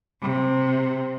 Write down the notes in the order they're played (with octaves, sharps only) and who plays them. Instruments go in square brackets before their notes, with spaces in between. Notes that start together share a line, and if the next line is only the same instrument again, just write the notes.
[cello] C3